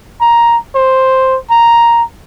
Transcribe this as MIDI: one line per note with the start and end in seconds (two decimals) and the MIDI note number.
0.21 0.57 82
0.75 1.36 72
1.51 2.03 82